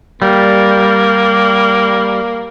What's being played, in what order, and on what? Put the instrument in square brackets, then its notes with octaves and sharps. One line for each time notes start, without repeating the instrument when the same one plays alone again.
[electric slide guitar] G3 [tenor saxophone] A#3